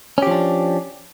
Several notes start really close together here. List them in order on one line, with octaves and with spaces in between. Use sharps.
C#4 G4 F3 D4